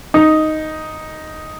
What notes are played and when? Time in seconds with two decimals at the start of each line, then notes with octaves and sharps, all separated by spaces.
0.14 D#4